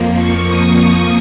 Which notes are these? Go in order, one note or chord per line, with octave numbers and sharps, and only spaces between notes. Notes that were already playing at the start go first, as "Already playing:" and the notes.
Already playing: F2 F3 A#3
C#6
D#6